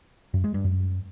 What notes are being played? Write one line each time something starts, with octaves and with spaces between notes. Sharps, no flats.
F#2
G#3
G2
F#2